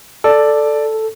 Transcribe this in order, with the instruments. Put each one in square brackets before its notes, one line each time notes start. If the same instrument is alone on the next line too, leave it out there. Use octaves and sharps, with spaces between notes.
[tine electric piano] A4 [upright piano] D5